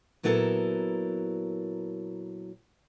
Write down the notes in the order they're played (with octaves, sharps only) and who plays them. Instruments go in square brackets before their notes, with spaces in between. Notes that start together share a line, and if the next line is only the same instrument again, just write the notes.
[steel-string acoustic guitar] A#2 F#3 B3 E4 A4 A#4